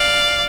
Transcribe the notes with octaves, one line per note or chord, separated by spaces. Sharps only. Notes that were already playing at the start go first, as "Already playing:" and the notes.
Already playing: D5 F5